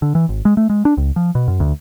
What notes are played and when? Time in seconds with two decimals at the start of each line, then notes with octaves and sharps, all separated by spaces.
0.02 D3
0.15 E3
0.29 G#1
0.45 G#3
0.57 A3
0.70 G#3
0.85 D4
0.97 C#2
1.16 F3
1.35 B2
1.48 F#2
1.60 D2